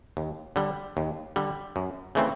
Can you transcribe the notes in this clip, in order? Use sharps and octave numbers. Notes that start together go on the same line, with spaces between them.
D#2
D3 G3
D#2
D3 G3
F#2
C#3 E3 A3 C4